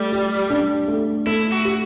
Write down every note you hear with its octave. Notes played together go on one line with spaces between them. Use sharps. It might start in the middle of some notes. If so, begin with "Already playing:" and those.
Already playing: G3 A3
G4
D4
A3
A3 E4
F#4
G4